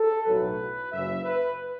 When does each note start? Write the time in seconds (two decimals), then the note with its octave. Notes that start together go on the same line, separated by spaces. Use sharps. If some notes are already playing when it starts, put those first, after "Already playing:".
Already playing: A4
0.25 B1 A2 F#3 B4
0.91 F#1 F#2 C#3 E5
1.23 B4